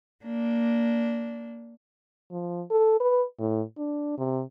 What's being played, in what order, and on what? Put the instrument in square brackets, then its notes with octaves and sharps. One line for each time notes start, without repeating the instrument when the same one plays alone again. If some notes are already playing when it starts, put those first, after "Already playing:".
[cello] A#3 D4
[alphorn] F3
A4
B4
A2
D4
C3